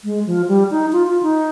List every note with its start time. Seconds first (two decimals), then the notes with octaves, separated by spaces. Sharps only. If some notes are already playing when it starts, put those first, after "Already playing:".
0.04 G#3
0.26 F3
0.48 G3
0.71 D#4
0.93 F4
1.07 F4
1.23 D#4